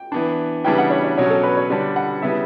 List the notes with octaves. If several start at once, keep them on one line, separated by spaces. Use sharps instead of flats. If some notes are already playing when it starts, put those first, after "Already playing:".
Already playing: G5
E3 B3 D4
C#3 E3 G3 B3 D4 G5
F#5
C#5
C#5
B2 F#3 C#4 C#5
A4
B4
C#5
D3 G3 D4 D5
F#5
C#3 G3 B3 E4 E5